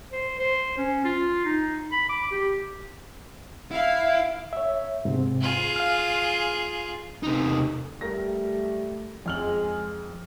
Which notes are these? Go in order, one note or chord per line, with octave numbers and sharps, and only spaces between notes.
C5
C5
C#4
F4
D#4
B5
D6
G4
E4 F5
C#5 E5
G#2 C3 C4
F4 G#4
F5 F6
C3 D#4
G3 A3 A#4 A#6
F2 G#3 F6 F#7